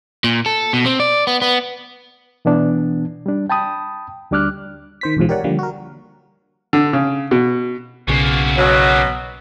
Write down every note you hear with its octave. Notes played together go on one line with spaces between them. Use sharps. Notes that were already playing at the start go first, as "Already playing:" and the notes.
A#2
A4
B2
C4
D5
B3
B3
B2 E3 B3 D4
G3 D4
G5 A5 B5 D#6
D2 G3 D4 D6 F6 F#6
D#3 C5 B6
B1 E2 G#2 F3
G4 A#4 C#5 D5 F#5
D3 F3 G3 A#3
F#4 A#4
D3
C#3
B2
B1 C#3 A#3 F#4
B2 F#3